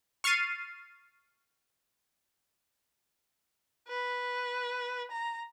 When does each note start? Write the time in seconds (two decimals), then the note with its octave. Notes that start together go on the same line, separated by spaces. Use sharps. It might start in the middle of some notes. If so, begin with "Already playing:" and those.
0.24 C#6 F6 A6 C7 D#7
3.88 B4
5.11 A#5